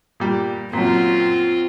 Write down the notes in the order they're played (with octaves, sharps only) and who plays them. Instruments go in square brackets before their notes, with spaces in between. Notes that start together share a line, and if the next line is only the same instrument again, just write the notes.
[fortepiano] A#2 G3
[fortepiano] F#2 A#2 [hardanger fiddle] C4 F4